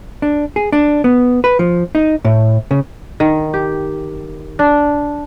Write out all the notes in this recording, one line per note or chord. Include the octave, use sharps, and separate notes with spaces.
D4
G#4
D4
B3
B4
F3
D#4
A2
C#3
D#3
G4
D4